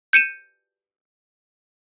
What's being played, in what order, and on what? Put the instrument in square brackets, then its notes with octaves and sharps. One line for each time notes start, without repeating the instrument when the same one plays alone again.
[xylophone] G6 C#7 D#7 E7